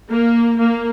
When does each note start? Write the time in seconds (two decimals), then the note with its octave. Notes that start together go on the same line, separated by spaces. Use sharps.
0.10 A#3
0.58 A#3